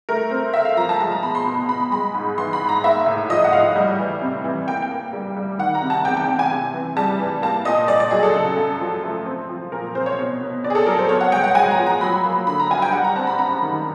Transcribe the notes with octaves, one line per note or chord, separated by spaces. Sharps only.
A3 A#4
C4
C4 E5
F5
F3 A#5
A5
A#5
G#3 A5
A#5
B2 B5
C6
B2
B2 B5
G#3 B5
G#2
E3 C6
B5
G#2
A#5
A#3 E5
A2
F3 D#5
F#5
A2 F5
G3
E3
C3
E3
A#3 G5
G5
A#3
G3
G3
D#3 F#5
A#5
C3
A5
E2 G5
G5
C3
G#5
C3
E3
G3 A5
E3
A#3 A5
A#2 D#5
A#2 D5
D5
F#3 G#4
A4
C#3
F#2
F3
A3
C4
F3
A#2 A#4
C4 C5
C#5
B2
B2
B2 D5
G#4
A4
F#3 A#4
C5
B3 C#5
F#5
G#3 G5
F#5
G#3 G#5
A#5
F3
A#5
F#3 B5
A#3
D3 B5
A#5
G2 G#5
G5
G3 F#5
A#5
C4 A5
B5
F#2 A#5
D#3